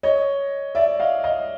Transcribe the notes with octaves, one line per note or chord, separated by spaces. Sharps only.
C#5 D#5
D5 E5
D#5 F5
D#5 F5